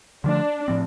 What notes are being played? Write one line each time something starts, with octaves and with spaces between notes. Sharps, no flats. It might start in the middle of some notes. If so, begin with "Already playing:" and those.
D3 F3 A3 D4
A2 F3 C4